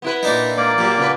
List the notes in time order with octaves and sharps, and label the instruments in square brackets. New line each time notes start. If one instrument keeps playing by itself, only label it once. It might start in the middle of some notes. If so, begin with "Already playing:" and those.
[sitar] B3 E4 B4
[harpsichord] A#2 D4 D#4
[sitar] G#2 [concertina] A#3 D5
[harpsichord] A#2 [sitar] F#3 G3
[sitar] C#3 B3 B4